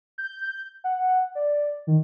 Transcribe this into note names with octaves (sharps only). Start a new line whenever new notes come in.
G6
F#5
D5
D#3